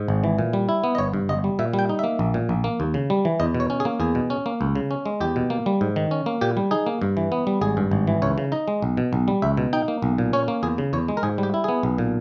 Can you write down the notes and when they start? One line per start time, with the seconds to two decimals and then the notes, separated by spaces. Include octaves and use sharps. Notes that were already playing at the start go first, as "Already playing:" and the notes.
Already playing: G#2
0.08 G#1
0.24 E3
0.38 A#2
0.53 G3
0.69 E4
0.84 B3
0.95 D#5
0.98 G1 C#5
1.14 G2
1.29 G1 D#5
1.44 G3
1.59 A#2 E5
1.74 G3
1.79 G5
1.89 D#4
1.99 A#3 E5
2.19 A#1
2.34 A#2
2.49 A#1
2.64 A#3
2.80 D#2
2.94 C#3
3.10 G3
3.25 E3
3.40 E2 D#5
3.54 B2
3.60 C#5
3.70 C#4
3.80 G#4
3.85 A#3
4.00 E2 G#4
4.15 B2
4.30 C#4
4.46 A#3
4.61 C#2
4.75 C#3
4.91 C#4
5.06 G#3
5.20 E2 G4
5.36 B2
5.50 A#3
5.66 G3
5.81 G#2
5.96 D#3
6.11 C#4
6.26 A#3
6.41 A#2 G4
6.57 G3
6.71 D#4 G#4
6.86 A#3
7.02 G2
7.17 E3
7.32 B3
7.47 G3
7.61 G#1 G#4
7.77 G2
7.91 G#1
8.07 E3
8.22 C#2 C#5
8.38 C#3
8.52 D#4 D#5
8.68 G#3
8.82 B1
8.97 B2
9.13 B1
9.28 G3
9.42 C#2 E5
9.57 B2
9.73 D#4 G5
9.88 A#3
10.02 B1
10.18 A#2
10.33 C#4 C#5
10.48 A#3
10.63 E2 G#4
10.78 C#3
10.93 E2 C#5
11.08 G#3
11.17 A#4
11.23 G#2 G#4
11.38 G3
11.43 G4
11.54 E4
11.64 B3 G#4
11.83 B1
11.98 A#2